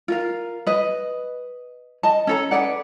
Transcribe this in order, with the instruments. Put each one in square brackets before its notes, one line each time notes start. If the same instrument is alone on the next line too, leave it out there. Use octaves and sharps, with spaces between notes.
[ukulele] F4 A#4 F5
B4 D#5
D#5 A5
C#4 A4 A#5
G#4 B4 D5 F#5